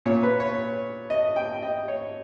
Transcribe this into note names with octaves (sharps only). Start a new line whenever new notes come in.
A#2 C#5
B4
C#5
D#5
G5
D#5
C#5